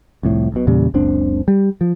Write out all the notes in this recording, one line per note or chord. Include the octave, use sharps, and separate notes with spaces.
C2 F2 A2
B1 B2
E2 A#2 C#3 G3
F#1 C#2 C4 D4
G3
F3